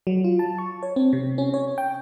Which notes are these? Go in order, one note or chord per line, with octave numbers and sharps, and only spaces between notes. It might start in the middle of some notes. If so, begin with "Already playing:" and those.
F#3
F4
A5
C#6
C#5
C4
C3
C#4
C#5
G5